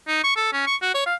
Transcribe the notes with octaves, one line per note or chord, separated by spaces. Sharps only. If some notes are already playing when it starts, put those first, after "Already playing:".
D#4
C#6
A4
C#4
C#6
F#4
C#5
F5